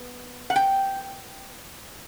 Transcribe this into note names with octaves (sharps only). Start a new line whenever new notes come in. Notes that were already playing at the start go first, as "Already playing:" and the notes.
Already playing: B3
F#5
G5